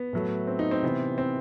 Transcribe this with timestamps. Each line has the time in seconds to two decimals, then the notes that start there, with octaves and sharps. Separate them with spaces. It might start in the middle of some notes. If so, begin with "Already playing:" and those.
Already playing: B3
0.13 A2 F#3 A3
0.47 C4
0.59 D#4
0.71 C4
0.82 C3 E3 B3
1.18 C4